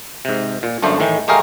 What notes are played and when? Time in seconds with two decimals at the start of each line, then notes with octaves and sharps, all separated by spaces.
0.25 G#2 C3
0.63 A#2
0.82 G1 F#2 A3 D4 C5
1.00 A2 D#3 E3
1.28 G#3 A3 G4 G#4 A#4 F5